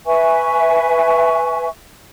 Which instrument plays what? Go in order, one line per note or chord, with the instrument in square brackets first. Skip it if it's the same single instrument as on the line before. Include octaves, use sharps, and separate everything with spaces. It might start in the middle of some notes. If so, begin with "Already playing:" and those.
[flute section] B4 E5 G#5 C#6